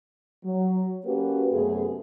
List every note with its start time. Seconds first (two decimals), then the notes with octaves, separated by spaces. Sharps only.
0.45 F#3
1.05 A#3 C#4 F#4 G4 B4
1.53 F#2 C3 A3 B3 G#4